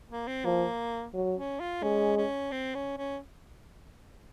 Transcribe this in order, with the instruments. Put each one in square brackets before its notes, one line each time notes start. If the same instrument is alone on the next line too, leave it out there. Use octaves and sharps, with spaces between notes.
[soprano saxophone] A#3
C4
[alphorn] F3 [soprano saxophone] A#3
[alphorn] F#3
[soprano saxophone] C#4
F4
[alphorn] G#3 [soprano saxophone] C#4
[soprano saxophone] C#4
C4
C#4
C#4